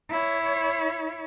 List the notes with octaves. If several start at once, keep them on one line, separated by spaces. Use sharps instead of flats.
E4 C#5